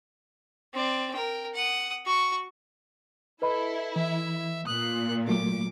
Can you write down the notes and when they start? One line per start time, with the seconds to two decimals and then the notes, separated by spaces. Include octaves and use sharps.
0.74 C4 D5
1.14 A#4 G5
1.54 F#5 D#6
2.06 F#4 C#6
3.42 E4 A4 B4 D#5 B5
3.96 E3 E5
4.67 A#2 D#6 F#6
5.28 F#3 A3 A#3 D6